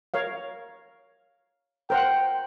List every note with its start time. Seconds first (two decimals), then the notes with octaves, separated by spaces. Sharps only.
0.14 A#4 C#5 F5
1.90 A#4 C5 F#5 G5